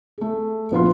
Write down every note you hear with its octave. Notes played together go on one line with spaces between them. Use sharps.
A3 G#4
A#1 B3 F4 C6